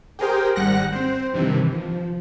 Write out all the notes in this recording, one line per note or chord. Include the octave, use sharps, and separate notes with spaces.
G4 G#4 A#4 C5 G5
G#1 G3 F#5 F#6 A#6
C4 C5
G2 C3 D#3 E3
F3